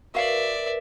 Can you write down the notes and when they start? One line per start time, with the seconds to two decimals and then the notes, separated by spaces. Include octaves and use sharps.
0.15 F#4 A#4 B4 D5 E5 F5